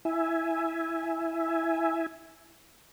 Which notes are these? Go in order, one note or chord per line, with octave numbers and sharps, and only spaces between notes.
E4 E5 G#5